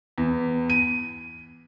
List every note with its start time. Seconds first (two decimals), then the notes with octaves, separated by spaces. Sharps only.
0.18 E2
0.70 D#7